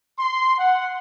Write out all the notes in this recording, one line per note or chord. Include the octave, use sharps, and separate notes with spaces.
C6
F#5